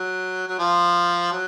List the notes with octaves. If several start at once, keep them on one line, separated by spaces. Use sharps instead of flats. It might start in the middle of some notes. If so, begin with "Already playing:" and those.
Already playing: F#3
F#3
F3
F#3